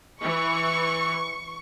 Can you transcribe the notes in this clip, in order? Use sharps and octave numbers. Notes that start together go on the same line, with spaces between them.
E3 C#6